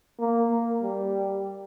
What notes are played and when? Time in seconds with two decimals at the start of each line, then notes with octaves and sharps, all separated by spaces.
0.19 A#3
0.51 A#3
0.82 G3